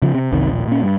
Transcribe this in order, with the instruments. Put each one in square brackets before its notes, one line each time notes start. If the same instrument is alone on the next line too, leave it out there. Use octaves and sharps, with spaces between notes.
[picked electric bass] C#3 F3
C3
F#1 C2 C3 D#3
D#1 A#1
A#2 C#4
G2